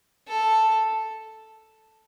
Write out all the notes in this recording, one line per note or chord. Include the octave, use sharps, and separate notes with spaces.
A4